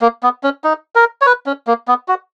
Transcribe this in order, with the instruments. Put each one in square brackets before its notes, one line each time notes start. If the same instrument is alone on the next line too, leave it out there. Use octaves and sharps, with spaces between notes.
[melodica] A#3
B3
C#4
D#4
A#4
C#5
B4
C#4
A#3
B3
F#4